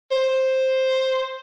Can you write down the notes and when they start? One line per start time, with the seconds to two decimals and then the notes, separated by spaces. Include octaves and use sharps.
0.12 C5